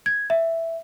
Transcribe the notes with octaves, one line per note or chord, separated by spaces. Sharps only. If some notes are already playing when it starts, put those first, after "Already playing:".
G#6
E5